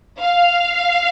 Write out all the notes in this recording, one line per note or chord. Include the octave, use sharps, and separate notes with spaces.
F5